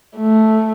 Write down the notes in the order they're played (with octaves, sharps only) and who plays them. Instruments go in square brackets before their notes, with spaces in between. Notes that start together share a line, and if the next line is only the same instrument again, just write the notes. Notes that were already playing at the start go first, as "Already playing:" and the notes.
[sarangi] A3